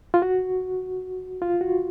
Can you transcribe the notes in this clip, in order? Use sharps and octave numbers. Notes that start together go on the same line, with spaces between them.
F4
F#4
F4
F#4